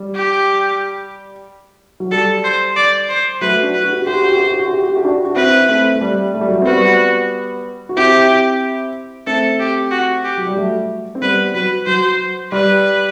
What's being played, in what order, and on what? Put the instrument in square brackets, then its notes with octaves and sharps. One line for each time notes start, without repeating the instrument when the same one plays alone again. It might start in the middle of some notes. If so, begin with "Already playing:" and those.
Already playing: [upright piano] G3
[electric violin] G4
[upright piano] F#3
[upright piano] G3 [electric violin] A4
[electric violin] C5
D5
C5
[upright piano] F#3 A3 [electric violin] B4
[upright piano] D4 F#4
[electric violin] B4
[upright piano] F#4
G4
F#4
[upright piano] G4 [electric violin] C5
[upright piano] F#4
G4
F#4
G4
F#4
G4
F#4
G4
F#4
G4
F#4
G4
D4 F#4
F#4
[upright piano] C4 E4 [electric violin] B4
[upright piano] A3 C4
A3
G3
A3
G3
F#3 A3
C4
[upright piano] G3 B3 [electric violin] F#4
[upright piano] F#4
[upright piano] C4 E4 [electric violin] G4
[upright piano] A3 C4 [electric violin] A4
[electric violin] G4
F#4
G4
[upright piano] F#3
G3
F#3 A3
C4
[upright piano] G3 B3 [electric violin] B4
[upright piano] F#3 [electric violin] B4
[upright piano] F#3 [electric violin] C5
[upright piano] G3 [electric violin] B4